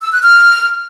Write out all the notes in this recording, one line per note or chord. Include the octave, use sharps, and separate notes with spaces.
E6
F#6
F6